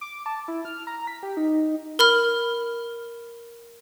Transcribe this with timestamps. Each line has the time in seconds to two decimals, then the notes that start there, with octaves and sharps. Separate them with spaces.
0.01 D6
0.26 A5
0.48 E4
0.65 F6
0.87 A#5
1.07 B6
1.23 G4
1.37 D#4
1.99 A#4 B5 F6